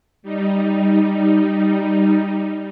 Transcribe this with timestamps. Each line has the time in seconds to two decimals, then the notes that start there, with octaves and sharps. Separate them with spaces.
0.22 G3 D#4